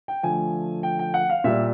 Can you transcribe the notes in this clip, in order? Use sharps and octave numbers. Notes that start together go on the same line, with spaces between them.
G5
D3 F3 A3 G#5
G5
G5
F#5
F5
A#2 G3 E5